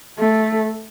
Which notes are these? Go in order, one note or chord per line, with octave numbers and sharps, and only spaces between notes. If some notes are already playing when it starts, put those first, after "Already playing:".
A3